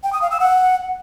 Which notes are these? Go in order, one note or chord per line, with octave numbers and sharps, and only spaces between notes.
G5
D#6
F5
E6
F#5